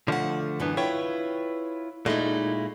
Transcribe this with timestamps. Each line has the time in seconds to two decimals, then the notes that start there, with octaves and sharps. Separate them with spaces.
0.08 F#2 D3 F3 A3 F#5
0.60 F#2 A2 D3 E3 B3 D4
0.77 E4 F4 B4 C#5 G5
2.06 A#2 G#3 A3 D#4 E4